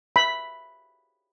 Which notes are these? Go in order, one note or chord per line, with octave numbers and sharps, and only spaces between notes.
B5